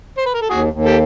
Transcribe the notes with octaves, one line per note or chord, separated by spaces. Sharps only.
C5
B4
A#4
A4
D#2 F#4 G#4
D#2
G4 A4